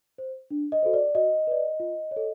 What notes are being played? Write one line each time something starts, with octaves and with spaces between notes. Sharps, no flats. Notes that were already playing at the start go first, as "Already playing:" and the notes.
C5
D4
D#5
F#4 A4 C5
D5
F#4 D#5
B4 D5
F4
C#5
A4